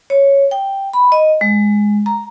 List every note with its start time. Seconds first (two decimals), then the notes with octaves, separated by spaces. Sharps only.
0.10 C#5
0.51 G5
0.93 B5
1.12 D#5
1.41 G#3
2.06 A#5